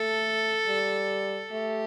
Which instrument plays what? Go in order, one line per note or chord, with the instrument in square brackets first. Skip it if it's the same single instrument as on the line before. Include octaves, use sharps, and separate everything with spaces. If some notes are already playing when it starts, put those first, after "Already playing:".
Already playing: [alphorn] A3 [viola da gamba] A4
[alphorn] G3
[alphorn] A3 [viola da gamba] G4